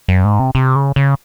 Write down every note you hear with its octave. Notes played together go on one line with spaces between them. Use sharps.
F#2
G#2
C3
C3
C#3
C#3